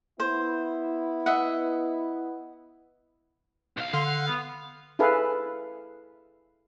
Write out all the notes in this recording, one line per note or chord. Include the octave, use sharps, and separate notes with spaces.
B3 E4 C5
D#5 E5 F#5
B1 F5
D3 F5 C6
F#5
B3
E4 G#4 A4 B4 F5